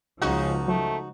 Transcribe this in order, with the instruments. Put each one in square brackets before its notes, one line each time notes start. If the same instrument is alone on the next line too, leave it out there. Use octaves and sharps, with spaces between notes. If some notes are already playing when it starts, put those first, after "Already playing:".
[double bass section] C#2 F3 [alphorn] C#3 [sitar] D#4 F#4
[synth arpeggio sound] F#3 [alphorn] A3